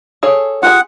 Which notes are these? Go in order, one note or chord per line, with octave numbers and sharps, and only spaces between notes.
G#4 A4 C#5
F4 G4 G#4 F#5